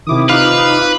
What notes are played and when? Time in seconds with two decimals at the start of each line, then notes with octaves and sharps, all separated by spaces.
0.07 C3 D#3 E4 D6 D#6
0.29 D#4 F4 B4 F5